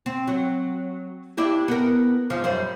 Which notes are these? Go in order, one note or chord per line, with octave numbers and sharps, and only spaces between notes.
C4
F#3
D4 E4 G4
B3 A#4
G#2 F3
F#2 G3 C5